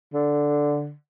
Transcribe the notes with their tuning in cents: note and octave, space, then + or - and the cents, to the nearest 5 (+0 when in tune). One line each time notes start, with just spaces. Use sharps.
D3 -5